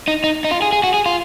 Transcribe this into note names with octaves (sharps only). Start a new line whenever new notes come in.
D#4
D#4
D#4
F4
G#4
G#4
F#4
G#4
F4